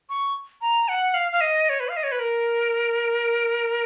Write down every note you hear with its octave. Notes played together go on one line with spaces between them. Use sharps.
C#6
A#5
F#5
F5
F5
D#5
C#5
B4
F5
D#5
C#5
B4
A#4